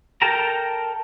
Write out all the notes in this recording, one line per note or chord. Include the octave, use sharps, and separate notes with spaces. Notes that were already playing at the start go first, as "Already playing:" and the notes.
A4 A#4 G5 A5 A#5